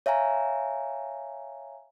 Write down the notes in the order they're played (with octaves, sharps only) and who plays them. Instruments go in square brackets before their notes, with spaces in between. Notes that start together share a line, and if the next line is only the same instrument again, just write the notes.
[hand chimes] C#5 E5 F5 G#5 A#5